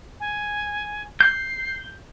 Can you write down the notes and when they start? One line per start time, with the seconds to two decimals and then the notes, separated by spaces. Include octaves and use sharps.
0.20 G#5
1.21 G6 C7